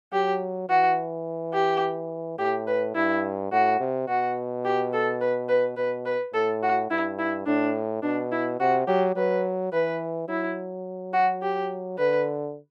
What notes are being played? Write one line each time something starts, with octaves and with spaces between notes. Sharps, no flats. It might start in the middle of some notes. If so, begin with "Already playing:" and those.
F#3 G4
E3 F#4
G4
A2 G4
B4
G2 E4
A2 F#4
C3
B2 F#4
G4
A4
B4
B4
B2 B4
B4
A2 A4
F#4
G2 E4
E4
A2 D4
B2 D4
E4
C3 F#4
F#3 G4
F#3 B4
E3 B4
F#3 E4
F#4
G4
D3 B4